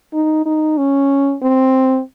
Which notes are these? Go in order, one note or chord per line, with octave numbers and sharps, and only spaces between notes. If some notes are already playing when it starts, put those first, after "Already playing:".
D#4
D#4
C#4
C4